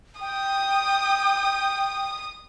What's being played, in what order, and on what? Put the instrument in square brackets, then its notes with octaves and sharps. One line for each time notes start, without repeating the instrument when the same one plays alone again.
[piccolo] G5 [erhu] D#6